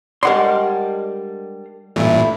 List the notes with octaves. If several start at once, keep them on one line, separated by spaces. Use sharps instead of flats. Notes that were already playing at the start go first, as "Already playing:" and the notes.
G3 G#3 D4 A#4 F#5 C6
A1 G2 A#2 A3 E4